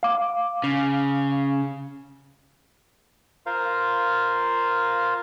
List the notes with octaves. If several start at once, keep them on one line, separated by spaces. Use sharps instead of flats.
F5 D6
C#3
F4 A#4 C5 F5